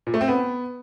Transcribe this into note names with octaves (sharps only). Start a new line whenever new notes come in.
A#2
A3
C4
B3